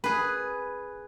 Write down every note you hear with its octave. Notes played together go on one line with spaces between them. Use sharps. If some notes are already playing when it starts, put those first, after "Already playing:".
G#4 B4